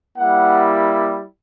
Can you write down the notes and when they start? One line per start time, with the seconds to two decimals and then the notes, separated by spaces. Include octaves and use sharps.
0.17 G3 A#3 E4 F#5